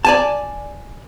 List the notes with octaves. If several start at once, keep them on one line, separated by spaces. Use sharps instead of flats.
D5 G#5 A5